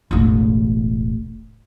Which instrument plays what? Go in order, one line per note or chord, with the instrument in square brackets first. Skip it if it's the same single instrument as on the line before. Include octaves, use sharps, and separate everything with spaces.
[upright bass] E1 A1